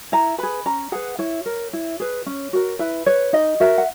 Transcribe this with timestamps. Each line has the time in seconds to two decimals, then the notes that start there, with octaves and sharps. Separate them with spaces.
0.12 E4 A#5
0.38 G#4 B4 B5
0.66 C#4 A#5
0.92 G#4 B4 F#5
1.19 E4 C#5
1.46 A#4
1.73 E4
2.00 G#4 B4
2.26 C#4
2.53 F#4 A#4
2.79 E4 B4
3.06 B4 C#5
3.33 D#4 D#5
3.60 F#4 A#4 E5
3.78 F#5